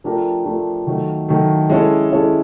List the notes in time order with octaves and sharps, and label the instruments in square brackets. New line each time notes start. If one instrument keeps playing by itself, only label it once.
[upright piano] F3 A3 D4 G4 A#4
F3 A3 D4 G4 A#4
D#3 F#3 A3
D#3 F#3 A3
G#3 C#4 E4 A4
G#3 C#4 E4 A4